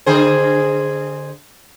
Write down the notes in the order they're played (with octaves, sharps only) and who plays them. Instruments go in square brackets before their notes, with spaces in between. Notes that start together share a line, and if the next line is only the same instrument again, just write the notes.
[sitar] D3 G#4 C5